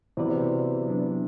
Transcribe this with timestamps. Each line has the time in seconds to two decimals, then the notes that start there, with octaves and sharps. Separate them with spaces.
0.17 C3 E3 B3 F#4 B4 D5
0.86 F#3 B3 D4